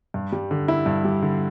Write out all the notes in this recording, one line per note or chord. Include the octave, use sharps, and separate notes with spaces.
G2
G3
D3
E4
G2
G3
D3